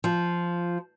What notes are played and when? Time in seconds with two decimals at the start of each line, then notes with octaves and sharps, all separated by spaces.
0.04 F3